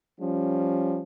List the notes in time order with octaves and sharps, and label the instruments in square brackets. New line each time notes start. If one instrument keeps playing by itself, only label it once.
[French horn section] F3 G3 C#4